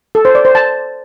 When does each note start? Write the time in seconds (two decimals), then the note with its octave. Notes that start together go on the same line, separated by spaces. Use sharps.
0.15 A4
0.25 C5
0.35 D5
0.45 C5
0.55 A5